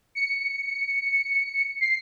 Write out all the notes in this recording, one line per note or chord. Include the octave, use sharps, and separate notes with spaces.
C#7
C7